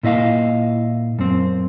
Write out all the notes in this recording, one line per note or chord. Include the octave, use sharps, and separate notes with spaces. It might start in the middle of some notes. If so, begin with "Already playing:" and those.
A#2 E4 D#5 F5
F#2 C4